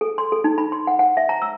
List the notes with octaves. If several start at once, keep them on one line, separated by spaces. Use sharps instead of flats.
A4
C6
A4
D#4
B5
C6
F#5
F#5
E5
A#5
E6